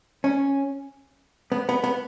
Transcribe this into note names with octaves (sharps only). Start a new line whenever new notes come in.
C#4
B3
B3
B3